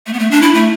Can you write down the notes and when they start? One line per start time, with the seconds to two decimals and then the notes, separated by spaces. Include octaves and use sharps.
0.07 A3
0.13 B3
0.19 A3
0.31 D4
0.42 E4
0.54 A3